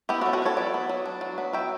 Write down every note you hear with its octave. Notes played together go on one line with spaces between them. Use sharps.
B3 E4 G4
F#4 A4
F#3
F#4 A4
D4
A4 C#5
F#3 B4 D5
B3
F#3
D4
F#3
B3
F#3 E5 G5